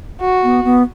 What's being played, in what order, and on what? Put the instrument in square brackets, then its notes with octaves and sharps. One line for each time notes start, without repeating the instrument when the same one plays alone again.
[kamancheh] F#4
[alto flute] B3
B3